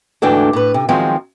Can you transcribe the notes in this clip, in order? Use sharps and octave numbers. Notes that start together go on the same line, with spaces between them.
D2 G#2 E3 A3 D4 G5
A2 B4
C3
D#3 F3 F#3 G#3 C4